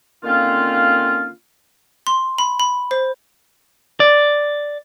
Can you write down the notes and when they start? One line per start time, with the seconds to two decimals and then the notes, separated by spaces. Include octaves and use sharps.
0.24 D3 D#3 A#3 C4 C#4 F4
2.07 C6
2.38 B5
2.60 B5
2.91 C5
4.00 D5